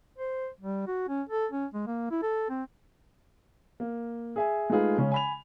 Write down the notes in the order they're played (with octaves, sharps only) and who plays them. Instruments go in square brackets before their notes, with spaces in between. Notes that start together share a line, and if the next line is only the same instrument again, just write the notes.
[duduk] C5
G3
F#4
C#4
A4
C#4
G#3
A#3
E4
A4
C4
[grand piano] A#3
G#4 E5 G#5
G#3 A3 D#4 F4 G#4 B4
C#3 G#3 C#4
G#5 B5 F7